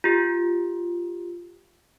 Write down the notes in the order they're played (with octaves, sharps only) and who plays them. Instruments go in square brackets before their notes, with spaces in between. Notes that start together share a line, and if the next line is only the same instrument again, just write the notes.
[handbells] F4 G4